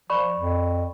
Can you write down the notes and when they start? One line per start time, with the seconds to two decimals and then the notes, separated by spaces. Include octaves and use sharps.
0.10 F3 D5 B5 C#6
0.38 F2